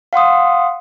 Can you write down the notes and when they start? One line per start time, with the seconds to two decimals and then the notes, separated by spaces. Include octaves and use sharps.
0.13 F5 F#5 C6 D#6